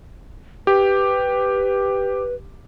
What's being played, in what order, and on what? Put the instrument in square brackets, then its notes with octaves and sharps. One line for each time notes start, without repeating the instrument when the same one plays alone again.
[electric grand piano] G4 [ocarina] B4